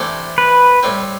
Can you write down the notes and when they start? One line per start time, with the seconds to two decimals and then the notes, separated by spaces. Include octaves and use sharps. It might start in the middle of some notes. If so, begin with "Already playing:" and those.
Already playing: C3 E3 A3 D4
0.38 B4
0.83 A2 G3 C4